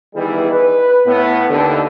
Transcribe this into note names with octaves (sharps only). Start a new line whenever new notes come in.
D#3 E3 G3 B3 E4 G#4
B4
A2 B3
D#2 D3